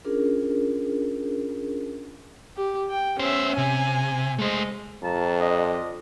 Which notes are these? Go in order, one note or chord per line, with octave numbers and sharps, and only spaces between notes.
C#4 D4 F4 G#4 A#4
G4
G5
B3 C#4 C5 E5
C3 G#5
G#3 A3 C5 D#5
F2 F5 A5 A#5
D4 F4 D#5